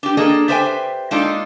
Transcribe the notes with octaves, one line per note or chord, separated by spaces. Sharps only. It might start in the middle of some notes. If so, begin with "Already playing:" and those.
D4 G4
A#3 D4 G#4 A4 D#5
G4 B4 C5 E5 G5 G#5
G#3 A#3 D4 D#4 F4 A4